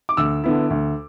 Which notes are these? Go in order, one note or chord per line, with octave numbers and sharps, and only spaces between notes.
D6
D2 E6
D3 B3 E4
D2